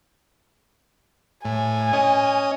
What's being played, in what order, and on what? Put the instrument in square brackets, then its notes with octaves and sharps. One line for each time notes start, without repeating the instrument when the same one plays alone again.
[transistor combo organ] A2 [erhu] G#5
[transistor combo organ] C#4 D#5